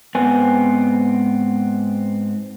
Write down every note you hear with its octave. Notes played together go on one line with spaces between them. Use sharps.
G#2 B3 C4 G#5